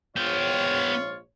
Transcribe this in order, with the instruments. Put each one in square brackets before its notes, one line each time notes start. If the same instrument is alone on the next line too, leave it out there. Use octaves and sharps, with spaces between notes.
[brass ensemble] A#1 G#2 C#5 [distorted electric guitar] B3 G5 [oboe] F4